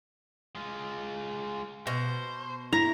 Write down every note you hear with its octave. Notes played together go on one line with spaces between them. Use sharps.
G#3 F4
B2 C5
E4 A#5